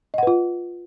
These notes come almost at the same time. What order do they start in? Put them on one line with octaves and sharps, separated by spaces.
D#5 F#5 B4 F4